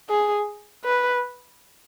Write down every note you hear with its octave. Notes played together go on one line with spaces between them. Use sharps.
G#4
B4